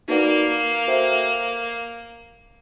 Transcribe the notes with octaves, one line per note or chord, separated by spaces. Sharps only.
A#3 D#4 F#4 B4 D5 F#5
F#4 A4 C5 E5 G5